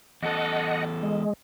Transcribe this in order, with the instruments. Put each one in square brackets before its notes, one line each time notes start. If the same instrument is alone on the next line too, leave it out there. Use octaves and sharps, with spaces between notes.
[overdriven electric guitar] E2 A4 [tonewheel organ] D#5 F#5
[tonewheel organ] G#3